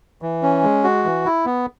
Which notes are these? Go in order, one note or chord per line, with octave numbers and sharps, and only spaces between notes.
E3
C#4
G#3
F#4
E3
E4
B3